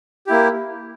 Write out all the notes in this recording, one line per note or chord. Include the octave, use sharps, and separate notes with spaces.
A#3 E4 G4